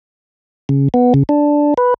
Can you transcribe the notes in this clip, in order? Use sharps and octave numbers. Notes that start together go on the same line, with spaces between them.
C#3
B3
C#3
D4
B4